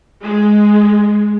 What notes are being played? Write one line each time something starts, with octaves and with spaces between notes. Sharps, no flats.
G#3